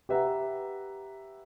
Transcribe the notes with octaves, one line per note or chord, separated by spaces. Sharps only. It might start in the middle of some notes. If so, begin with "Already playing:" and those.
G4 B4 E5 F#5 A#5